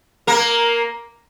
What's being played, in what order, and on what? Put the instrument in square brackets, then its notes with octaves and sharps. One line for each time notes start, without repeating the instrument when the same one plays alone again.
[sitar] A#3 A#4